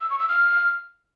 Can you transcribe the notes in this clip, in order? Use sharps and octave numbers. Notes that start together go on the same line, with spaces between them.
E6
C#6
E6
F6